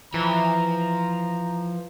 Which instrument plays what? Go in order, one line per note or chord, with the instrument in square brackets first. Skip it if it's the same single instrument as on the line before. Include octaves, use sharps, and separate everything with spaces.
[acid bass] E3 [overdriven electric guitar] F3 [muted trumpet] A#5